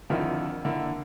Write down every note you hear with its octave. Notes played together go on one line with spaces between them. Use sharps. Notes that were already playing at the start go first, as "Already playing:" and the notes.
F2 D3 D#3 F3 E4
D3 A#3 E4